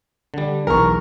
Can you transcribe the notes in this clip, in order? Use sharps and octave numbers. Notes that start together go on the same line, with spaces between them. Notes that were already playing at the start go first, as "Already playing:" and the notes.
D3 G3
B1 E2 A#4 C#6